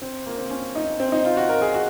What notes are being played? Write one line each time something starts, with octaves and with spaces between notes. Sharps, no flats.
C4
A#3
C4
C#4
D#4
C4
D#4
F4
F#4
A#4
G#4
F#4